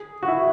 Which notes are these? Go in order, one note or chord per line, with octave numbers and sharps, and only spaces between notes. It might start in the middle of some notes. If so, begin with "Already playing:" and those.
Already playing: G#4
F#4
E4